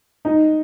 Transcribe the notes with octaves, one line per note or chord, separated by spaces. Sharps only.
D#4